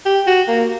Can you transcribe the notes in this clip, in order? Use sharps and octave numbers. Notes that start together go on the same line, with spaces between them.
G4
F#4
A#3